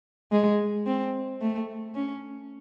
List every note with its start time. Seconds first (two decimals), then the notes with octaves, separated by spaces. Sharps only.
0.32 G#3
0.86 C4
1.41 A3
1.95 C#4